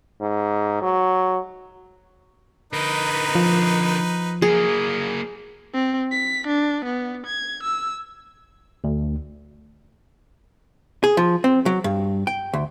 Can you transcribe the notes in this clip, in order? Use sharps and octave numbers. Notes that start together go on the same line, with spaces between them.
G#2
F#3
D3 D#4 A#4 B4
F3
F#3 A#3 G#4
C4
B6
D4
B3
G#6
E6
D2
G#4
F3
C4
F#3
G2
G5
D2